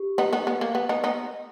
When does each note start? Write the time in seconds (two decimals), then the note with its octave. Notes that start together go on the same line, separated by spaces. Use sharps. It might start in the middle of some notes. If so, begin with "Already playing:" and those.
Already playing: G4
0.18 B3 D#4
0.33 B3 D#4
0.47 B3
0.61 A#3
0.75 B3
0.89 B3 D#4
1.04 B3 D#4